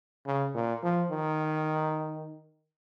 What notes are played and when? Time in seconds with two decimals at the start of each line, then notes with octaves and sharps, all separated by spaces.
0.26 C#3
0.54 A#2
0.83 F3
1.11 D#3